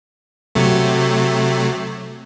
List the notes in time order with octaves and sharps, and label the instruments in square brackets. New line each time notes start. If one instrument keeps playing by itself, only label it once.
[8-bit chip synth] C3 F#3 A3